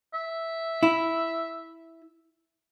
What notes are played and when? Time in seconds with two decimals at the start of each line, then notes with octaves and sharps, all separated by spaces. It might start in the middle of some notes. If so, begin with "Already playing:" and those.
0.14 E5
0.83 E4